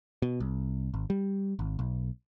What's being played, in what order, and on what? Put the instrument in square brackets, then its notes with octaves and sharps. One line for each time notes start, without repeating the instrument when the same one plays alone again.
[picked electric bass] B2
C2
G#1
G3
G#1
B1